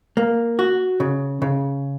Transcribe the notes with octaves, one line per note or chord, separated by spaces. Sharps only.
A#3
F#4
C#3
C#3